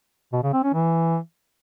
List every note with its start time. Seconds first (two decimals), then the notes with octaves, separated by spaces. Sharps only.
0.33 B2
0.43 C#3
0.53 C4
0.64 C#4
0.74 E3